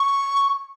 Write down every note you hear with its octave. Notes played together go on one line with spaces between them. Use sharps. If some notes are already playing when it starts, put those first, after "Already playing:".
Already playing: C#6